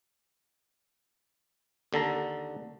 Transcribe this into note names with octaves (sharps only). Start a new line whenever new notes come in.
D#2 D3 A4 A#5